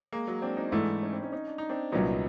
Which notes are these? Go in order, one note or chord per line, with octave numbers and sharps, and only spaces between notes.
G#3 A#3
F#3 G#3
C4 D4
C#4 D#4
G#2 E3 A3 D4 E4
C#4 D#4
C4 D4
C#4 D#4
C#4 D#4
D4
D#4
C4 D4
C2 A#2 F#3 B3 C#4 D#4